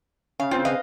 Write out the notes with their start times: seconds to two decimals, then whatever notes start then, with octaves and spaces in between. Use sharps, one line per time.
0.40 C#3 F5
0.51 C4 F4 C5 G5
0.65 B4 D#5 F5